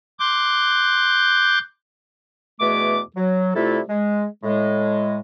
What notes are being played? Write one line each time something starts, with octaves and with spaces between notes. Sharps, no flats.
C6 D6 F#6 G6
E2 B2 A3 G#4 D6
F#3
C3 G3 A3 E4 F4 A4
G#3
A2 G#3